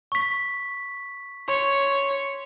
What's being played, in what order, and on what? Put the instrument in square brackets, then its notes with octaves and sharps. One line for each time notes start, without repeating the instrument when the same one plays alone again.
[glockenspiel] C#6 B6
[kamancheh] C#5 [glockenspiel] C6